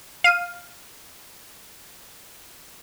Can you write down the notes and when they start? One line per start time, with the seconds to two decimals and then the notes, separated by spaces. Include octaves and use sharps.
0.24 F5 D#7